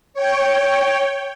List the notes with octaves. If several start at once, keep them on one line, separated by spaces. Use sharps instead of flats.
C#5 G5